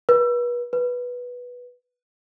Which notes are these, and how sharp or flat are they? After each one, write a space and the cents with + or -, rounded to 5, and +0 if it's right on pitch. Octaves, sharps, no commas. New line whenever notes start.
B4 -35
B4 -10